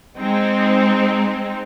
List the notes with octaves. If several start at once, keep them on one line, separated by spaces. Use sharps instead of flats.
G#3 C4 D#4